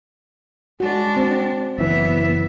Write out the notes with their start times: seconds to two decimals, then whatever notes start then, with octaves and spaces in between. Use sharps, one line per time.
0.80 G#3 D4 F#4
1.17 C4
1.79 F#1 E3 B3 E5